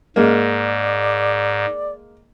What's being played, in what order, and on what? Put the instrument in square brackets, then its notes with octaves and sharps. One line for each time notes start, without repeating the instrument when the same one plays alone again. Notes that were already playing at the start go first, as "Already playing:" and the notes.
[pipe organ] G#2 [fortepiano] G#3 A#3 [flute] D5